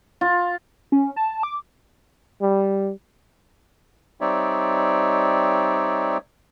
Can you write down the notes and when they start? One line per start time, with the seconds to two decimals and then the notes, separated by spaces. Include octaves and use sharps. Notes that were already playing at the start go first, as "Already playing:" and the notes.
0.21 F4
0.92 C#4
1.16 A5
1.43 D6
2.41 G3
4.21 G3 C4 D#4 C#5 D5 E5